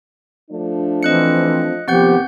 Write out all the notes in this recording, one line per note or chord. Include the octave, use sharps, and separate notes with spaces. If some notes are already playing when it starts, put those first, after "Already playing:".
F3 A3 D4
E3 C4 D#5 F#6 C#7
D#2 C3 F3 B3 C4 G4 F#5 G6